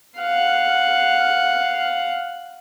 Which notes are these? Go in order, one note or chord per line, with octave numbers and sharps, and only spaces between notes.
F5 F#5